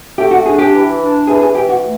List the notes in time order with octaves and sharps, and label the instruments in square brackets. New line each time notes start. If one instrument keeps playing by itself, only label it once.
[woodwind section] A3 [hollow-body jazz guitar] G4
[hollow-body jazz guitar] F#4
[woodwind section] D4 [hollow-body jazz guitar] G#4
[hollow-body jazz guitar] G4
[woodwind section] E3
D4
[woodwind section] E3 [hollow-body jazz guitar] G#4
[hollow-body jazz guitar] G#4
[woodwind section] E3 [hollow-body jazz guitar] G4
[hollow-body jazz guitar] F#4
[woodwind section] A3